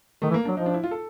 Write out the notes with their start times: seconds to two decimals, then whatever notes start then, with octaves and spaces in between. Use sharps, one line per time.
0.22 D#3 A3
0.30 E3
0.34 A#3
0.45 F#3 D4
0.57 F3 D#4
0.66 D4
0.74 E4
0.84 F4
0.91 A4